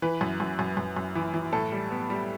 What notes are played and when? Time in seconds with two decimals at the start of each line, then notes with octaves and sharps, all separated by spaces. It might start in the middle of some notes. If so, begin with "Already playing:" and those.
0.02 E3 B4
0.21 F#2
0.40 F#2
0.59 F#2
0.77 F#2
0.97 F#2
1.15 E3
1.34 E3
1.52 A2 A4
1.72 G3
1.90 B3
2.10 G3